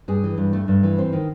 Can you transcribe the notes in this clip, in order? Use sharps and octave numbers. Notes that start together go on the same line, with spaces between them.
G2 G#4
E3
G2
A3
G2
E3
C4 C5
D#3